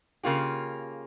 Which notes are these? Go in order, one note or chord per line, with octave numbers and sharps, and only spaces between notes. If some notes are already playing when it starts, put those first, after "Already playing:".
C#3 A#3 F4 G4